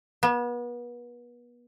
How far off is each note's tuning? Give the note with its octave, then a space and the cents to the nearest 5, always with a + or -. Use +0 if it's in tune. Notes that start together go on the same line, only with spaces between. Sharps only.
B3 -35